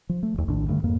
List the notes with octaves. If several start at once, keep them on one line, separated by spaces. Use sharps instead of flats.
F3
A3
E1 D#2
A#1 A2 D#3 D4
G2 D3 A3
F2 G#2 A#3